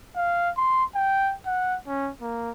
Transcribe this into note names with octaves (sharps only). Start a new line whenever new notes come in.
F5
C6
G5
F#5
C#4
A#3